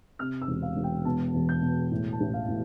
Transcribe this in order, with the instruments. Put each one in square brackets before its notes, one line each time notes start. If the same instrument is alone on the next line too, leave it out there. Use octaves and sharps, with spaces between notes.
[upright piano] C3 F6
E6
E1
F5
E1
G5
B2 A5
E2
G6
B2
A2
A5
A1
F5
A2